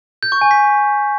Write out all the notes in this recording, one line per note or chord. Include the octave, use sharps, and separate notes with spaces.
G6
C#6
G#5
B6